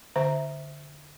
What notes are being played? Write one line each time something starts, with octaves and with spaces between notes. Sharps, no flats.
D3 C5 E5 A#5